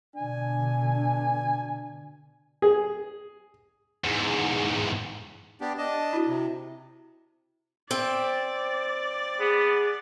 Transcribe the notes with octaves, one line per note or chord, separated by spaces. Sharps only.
B2 D3 D4 G#5
G#4
E2 G#2
B3 D4 G4
D4 D#5 A5
E4 F#4
C3
C4 D5 E5
B3 G#4